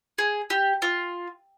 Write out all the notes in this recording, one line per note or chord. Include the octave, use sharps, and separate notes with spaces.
G#4
G4
F4